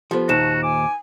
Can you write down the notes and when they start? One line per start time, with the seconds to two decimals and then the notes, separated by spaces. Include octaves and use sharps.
0.11 F3 B3 G4 A4 C5
0.29 D#2 A#2 D#4 F#4 C5 A5 E7
0.63 G#5 D6